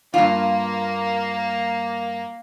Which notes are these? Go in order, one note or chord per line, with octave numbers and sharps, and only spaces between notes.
G2 A#3 F4